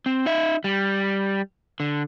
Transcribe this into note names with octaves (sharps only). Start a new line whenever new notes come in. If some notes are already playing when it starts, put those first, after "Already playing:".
C4
D#4 E5
G3
D3